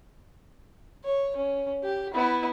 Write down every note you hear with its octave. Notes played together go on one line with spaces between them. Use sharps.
C#5
C#4
G4
B3 E4